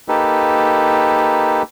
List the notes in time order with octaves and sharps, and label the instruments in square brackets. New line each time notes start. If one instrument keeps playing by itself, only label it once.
[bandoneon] A#3 D#4 G4 A4 B4